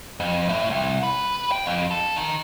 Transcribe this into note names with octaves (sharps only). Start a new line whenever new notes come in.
F2
A2
C2
B4
G5
F2
A4
D#3